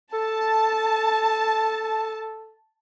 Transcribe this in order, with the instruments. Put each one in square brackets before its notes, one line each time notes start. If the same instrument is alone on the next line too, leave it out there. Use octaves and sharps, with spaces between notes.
[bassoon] A4 [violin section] A5